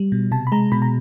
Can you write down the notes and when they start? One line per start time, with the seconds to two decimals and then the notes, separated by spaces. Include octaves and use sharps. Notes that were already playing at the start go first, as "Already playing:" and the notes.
Already playing: G3
0.12 B2
0.31 C3 A5
0.47 B5
0.52 G#3 A#5
0.72 B2 B5
0.82 A#5